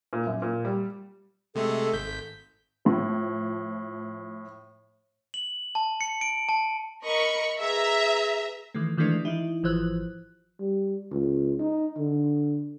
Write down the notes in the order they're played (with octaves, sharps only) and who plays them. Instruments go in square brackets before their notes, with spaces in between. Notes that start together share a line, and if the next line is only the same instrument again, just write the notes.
[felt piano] A#2
F#2
A#2
G3
[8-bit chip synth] C3 G#3 A3 [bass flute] A4
[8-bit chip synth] G#1 G6 B6
[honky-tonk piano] A2 F3
[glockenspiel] F#7
A5
C#7
D7
A5
[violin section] A#4 B5 C#6 [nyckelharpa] D#5
[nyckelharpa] G#4 B4 [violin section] E5 A#5
[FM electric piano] D#3 E3 A3
D#3 E3 G#3 A3 D4
E3 D#4 E4
G#1 E3 F3 C5 F#6
[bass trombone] G3
C#2
D#4
D3